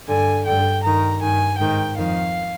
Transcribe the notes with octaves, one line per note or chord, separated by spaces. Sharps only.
G2 D3 G#5
G2 D3 G5
G2 D#3 A#5
G2 D#3 G#5
G#2 D#3 G5
F2 D#3 F5